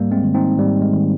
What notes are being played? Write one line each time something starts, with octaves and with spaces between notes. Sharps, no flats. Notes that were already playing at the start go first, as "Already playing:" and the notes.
Already playing: G#2 G3 A#3
G#3 C4
D#3
C4 D#4
G#2 G3
G#3
D#3